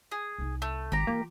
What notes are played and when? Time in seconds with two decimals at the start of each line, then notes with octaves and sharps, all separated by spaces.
0.12 G#4
0.38 C2 D#4
0.62 A3
0.92 G#1 G4 A#5
1.07 E3 A#3 F4